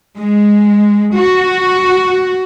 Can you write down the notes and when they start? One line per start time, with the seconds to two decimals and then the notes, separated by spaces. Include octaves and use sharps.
0.18 G#3
1.16 F#4